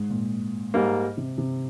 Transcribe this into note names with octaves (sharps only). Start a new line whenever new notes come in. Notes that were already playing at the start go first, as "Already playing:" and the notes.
Already playing: G#2
A#2
G#2 G3 A#3
C3
C3